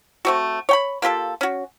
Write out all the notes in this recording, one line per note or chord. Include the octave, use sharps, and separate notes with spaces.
A3 C4 F#4
C#5 G5 B5
A#3 F4 G4 A4
C#4 F#4